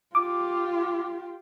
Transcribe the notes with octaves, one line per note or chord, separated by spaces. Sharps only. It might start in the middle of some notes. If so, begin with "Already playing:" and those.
F4 G4 D6